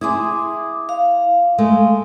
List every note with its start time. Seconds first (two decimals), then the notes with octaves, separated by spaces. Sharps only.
0.01 E4 G#4 C6 D6 D#6
0.89 F5
1.58 G#3 A3